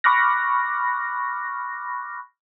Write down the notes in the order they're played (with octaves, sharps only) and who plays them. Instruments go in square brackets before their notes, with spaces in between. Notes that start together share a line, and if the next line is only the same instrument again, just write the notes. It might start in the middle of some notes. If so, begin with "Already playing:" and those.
[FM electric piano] B5 C#6 D6 F6 F#6 A#6